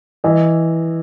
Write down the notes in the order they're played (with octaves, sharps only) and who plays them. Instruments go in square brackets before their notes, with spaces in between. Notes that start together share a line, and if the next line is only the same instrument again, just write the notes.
[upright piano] E3 D#5